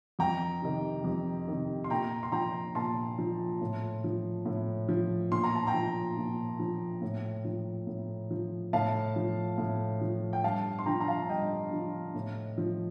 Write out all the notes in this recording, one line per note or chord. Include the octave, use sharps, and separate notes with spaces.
F2 G5 A#5
C3 D#3
F2
C3 D#3
C6
A#2 G5 A#5
C6
F3 G5 A#5
A#2 A5 C6
F3
A2
F3
A2
F3
A#2 C6
A#5
A5
G5 A#5
F3
A#2
F3
A2
F3
A2
F3
A2 F5 A5
F3
A2
F3
G5
G2 F5 A5
C6
D3 F3 G5 A#5
A#5
F5 A5
G2 D#5 G5
D3 F3
A2
F3